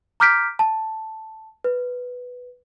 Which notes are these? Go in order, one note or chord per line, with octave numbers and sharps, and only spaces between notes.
A#5 D6 F6 G6 B6 D7
A5
B4